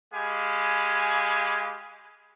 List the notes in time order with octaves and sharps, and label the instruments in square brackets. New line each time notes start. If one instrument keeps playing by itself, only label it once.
[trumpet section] G#3 G4 F5 G#5 B5